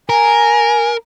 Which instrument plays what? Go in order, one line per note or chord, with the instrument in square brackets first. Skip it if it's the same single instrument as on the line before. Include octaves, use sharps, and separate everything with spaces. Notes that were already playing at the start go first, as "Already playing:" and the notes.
[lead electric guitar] A#4 [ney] G#5